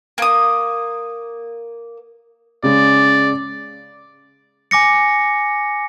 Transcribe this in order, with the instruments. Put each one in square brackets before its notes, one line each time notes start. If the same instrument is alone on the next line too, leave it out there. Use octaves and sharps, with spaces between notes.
[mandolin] A#3 D#6
[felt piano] C#3 G#3 [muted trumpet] D5
[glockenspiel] G#5 D6 A#6 C#7